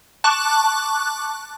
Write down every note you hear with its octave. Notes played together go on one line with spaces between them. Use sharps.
A5 C#6 D6 F#6